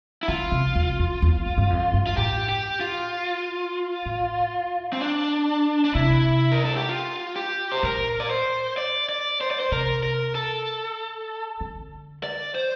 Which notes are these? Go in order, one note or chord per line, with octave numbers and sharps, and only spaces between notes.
E4
D3 F4
C3
E2
F2
E2
F2
G2
F2
G2
F4
A2 G4
G4
F4
A2
C4
D4
D4
C3 E4
A#4
A4
G4
F4
G4
C5
A#2 A#4
D5
C5
D5
D5
C5
D5
C5
C3 A#4
A#4
A4
D3
D5
C5